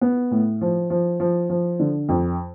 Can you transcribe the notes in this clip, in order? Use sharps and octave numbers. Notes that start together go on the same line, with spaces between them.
B3
A2
F3
F3
F3
F3
D3
F2